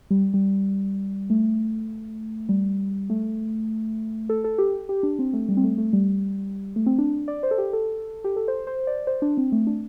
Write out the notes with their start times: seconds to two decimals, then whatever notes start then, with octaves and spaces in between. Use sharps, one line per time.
0.10 G3
0.34 G3
1.30 A3
2.49 G3
3.10 A3
4.29 A4
4.44 A4
4.58 G4
4.89 G4
5.03 D4
5.19 C4
5.33 A3
5.49 G3
5.57 C4
5.64 A3
5.78 A3
5.93 G3
6.76 A3
6.86 C4
6.98 D4
7.28 D5
7.43 C5
7.51 A4
7.58 G4
7.73 A4
8.24 G4
8.36 A4
8.48 C5
8.67 C5
8.87 D5
9.07 C5
9.22 D4
9.37 C4
9.52 A3
9.67 D4